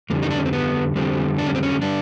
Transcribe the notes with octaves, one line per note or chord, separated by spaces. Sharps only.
F2 D3 G3 A#3
D#4
D4
C#4
C4
B3
F2 D3 G3 C4
D4
C#4
C4
C#4
D3 G3 D4